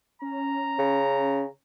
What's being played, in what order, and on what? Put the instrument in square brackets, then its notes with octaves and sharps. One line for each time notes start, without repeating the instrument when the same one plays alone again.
[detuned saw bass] C#4 [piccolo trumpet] A#5
[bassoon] C#3